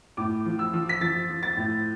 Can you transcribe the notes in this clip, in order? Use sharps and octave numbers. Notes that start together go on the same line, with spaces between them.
A2 D6
F3
E6
F3
B6
F3 A6
F3
A6
A2